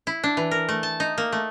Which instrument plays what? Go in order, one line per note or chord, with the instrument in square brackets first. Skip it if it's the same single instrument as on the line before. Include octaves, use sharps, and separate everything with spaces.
[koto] E4
D4
E3
A#4
A3
A5
D#4
A#3
A3